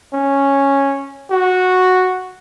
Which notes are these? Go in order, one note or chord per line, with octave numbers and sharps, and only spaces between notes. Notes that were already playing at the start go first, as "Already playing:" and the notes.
C#4
F#4